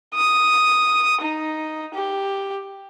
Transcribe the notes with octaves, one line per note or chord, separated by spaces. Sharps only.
D#6
D#4
G4